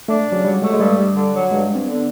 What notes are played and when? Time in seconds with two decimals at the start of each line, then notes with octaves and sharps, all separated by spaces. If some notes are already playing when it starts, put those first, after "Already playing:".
0.08 A3 D4
0.26 C#3
0.32 F#3
0.44 F#3 G3
0.62 G#3 A3
0.73 G#3
0.80 G2 G3
0.98 G2
1.16 D3
1.33 F#3
1.51 G2 G#3
1.69 G2
1.75 C4
1.87 D3 B3